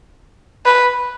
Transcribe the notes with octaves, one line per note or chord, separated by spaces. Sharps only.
B4